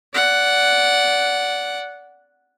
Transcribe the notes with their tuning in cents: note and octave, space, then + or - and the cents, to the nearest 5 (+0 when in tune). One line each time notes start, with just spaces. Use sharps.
D5 -20 F#5 +0